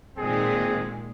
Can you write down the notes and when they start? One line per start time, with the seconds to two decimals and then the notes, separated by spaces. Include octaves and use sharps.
0.17 A#2 D#3 G#3 C4 G#4